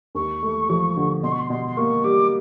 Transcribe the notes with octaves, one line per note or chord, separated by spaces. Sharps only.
D#2 C#6
A3
F3
D3
B2 C6
C#6
C6
B2 C6
C6
A#3 C#6
G3 D6